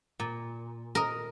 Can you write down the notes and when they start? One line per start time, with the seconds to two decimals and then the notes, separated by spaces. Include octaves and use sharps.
0.20 A#2
0.95 A#4 D#5